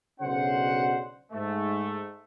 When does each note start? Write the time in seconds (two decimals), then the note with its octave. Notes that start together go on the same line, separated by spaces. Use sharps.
0.20 B1 C#3 D4 F#4 C5 F#5
1.31 G#2 A3